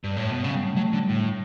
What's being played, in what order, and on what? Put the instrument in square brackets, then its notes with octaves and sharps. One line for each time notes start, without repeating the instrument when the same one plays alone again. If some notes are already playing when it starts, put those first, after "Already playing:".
[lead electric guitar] G2
A2
B2
[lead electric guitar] C#3 [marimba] F#3
[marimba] G3
A3
[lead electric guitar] F#3 [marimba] A3
[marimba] A3
[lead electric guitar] D3
[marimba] G3
[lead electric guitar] A2